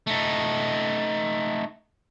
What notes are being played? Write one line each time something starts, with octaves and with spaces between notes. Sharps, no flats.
A3 D#4